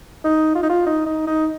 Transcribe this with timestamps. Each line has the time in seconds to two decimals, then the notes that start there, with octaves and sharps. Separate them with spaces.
0.24 D#4
0.55 F4
0.63 D#4
0.69 F4
0.86 D#4
1.06 D#4
1.27 D#4